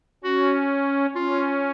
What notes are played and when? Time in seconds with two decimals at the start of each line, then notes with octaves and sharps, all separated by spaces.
0.24 C#4 F#4
1.15 C#4 F4